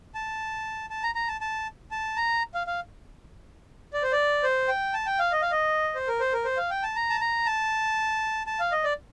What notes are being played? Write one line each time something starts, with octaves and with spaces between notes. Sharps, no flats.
A5
A5
A#5
A#5
A5
A5
A5
A#5
F5
F5
D5
C5
D5
C5
G5
A5
G5
F5
D#5
F5
D#5
C5
A#4
C5
A#4
C5
F5
G5
A5
A#5
A5
A#5
A5
A5
F5
D#5
D5